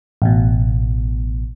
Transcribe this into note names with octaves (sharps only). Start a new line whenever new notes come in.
A1 B2